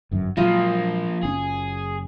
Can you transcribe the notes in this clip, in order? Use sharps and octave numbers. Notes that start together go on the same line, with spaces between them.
G1 F#2
A#2 F3 F#3 G#3 A#3 F4 D#5 B5
F#1 C4 C#4 G#4